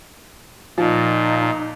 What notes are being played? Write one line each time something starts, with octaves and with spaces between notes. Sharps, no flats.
A#2 F3 D#4